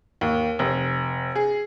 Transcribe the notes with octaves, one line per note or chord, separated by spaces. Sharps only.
D#2
F1
G#4